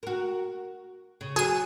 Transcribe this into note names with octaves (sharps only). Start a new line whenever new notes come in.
F#4 A#4
C#3
F#3 G#4 D#7